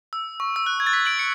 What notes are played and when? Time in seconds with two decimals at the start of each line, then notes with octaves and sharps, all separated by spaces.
0.13 E6
0.40 C#6
0.56 E6
0.66 F#6
0.80 G#6
0.87 A6
0.93 B6
1.06 D7 F#7
1.19 C#7